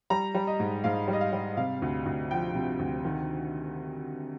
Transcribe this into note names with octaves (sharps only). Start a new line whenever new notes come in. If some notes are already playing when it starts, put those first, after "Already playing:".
G3 A#5
G3
D#5
G#2
G#2 F5
G3
D#5
F5
G3
C3 F5
D2
D2
F3 G5
C3
D2
D#3